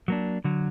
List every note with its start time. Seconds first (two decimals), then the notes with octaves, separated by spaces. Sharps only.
0.08 F#3 A#3 D4
0.44 D3 F#3